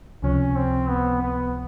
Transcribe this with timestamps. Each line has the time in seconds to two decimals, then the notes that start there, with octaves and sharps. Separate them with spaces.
0.23 C#2 C3 F3 C#4
0.56 C4
0.88 B3
1.22 B3